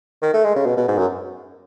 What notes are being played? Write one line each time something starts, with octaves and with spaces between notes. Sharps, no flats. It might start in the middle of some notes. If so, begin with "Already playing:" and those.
D#3
A3
G#3
C#3
B2
B2
G#2
F#2